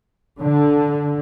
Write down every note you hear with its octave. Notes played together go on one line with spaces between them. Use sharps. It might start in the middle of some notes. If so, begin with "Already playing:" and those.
D3